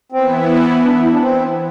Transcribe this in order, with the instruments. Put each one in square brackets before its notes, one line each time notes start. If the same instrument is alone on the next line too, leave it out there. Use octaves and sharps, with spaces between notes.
[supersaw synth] E3 B3 E4 [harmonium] C4
[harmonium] D4
B3
E4
D4
C4